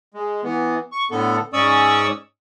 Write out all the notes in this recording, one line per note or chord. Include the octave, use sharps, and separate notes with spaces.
G#3
E3 B3
C#6
A2 D3 B3 A4
G#2 C#4 D5 C#6 D#6 E6